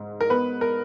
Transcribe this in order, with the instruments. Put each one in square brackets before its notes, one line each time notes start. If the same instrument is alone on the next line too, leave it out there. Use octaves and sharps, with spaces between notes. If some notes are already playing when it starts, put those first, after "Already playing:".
Already playing: [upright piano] G#2
A#4
B3 B4
A#4